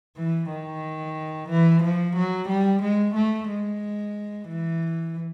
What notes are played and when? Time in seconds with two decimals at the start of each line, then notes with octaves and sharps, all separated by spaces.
0.17 E3
0.50 D#3
1.50 E3
1.83 F3
2.16 F#3
2.49 G3
2.83 G#3
3.15 A3
3.49 G#3
4.48 E3